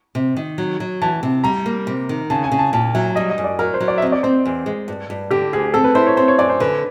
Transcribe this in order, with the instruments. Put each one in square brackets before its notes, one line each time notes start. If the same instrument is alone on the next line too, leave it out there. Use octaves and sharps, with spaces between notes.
[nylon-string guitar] C3
D#3
F#3
F#3
[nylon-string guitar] E3 [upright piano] A5
[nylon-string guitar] C3
[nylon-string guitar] G3 [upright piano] A#5
[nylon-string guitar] A#3
C3
D#3
[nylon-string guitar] C#3 [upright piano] A5
[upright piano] G#5
[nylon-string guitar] C#3
[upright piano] A5
[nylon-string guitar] A#2 [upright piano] A5
[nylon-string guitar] F#3 [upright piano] E5
[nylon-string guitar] G3 [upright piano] D#5
[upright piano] D#5
[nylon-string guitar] F#2
[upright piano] D5
[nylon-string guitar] F#3 [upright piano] A#4
[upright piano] C5
[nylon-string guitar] F#3
[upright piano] D5
E5
[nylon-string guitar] C4 [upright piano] D#5
[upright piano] D5
[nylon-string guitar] C4 [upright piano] C5
[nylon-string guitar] E2
G#3
G2
G2
[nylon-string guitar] D3 [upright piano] G4
[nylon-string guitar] D2 [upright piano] G#4
[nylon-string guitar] C4 [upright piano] A4
[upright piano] B4
[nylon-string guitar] E4 [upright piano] C5
[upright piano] C#5
[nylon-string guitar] C4 [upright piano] C5
[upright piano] C#5
[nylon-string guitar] F#2 [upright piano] D5
[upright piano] C5
[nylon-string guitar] D3 [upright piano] B4